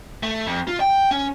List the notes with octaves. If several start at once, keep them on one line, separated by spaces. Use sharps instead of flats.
A3
F2
F4
G5
C#4